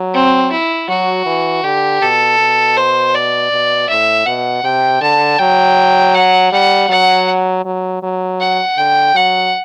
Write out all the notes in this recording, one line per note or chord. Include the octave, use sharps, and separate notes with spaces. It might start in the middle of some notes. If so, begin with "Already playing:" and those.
Already playing: F#3
C4
E4
F#3 F#4
E3
D3 G4
B2 A4
B2
C5
D5
B2
A2 E5
B2 F#5
C3 G5
D3 A5
F#3 G5
F#5
G3 F#5
F#3 F#5
F#3
F#3
F#5
D3 G5
F#3 F#5